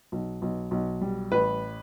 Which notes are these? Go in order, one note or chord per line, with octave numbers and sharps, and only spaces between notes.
B1
B1
B1
G3
A1 B4